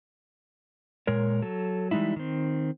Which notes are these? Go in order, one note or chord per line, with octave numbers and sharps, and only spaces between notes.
A#2 G#3 A#4 C#5
F#3 A4
E3 G3 G#3 D#4 E4
D#3 C4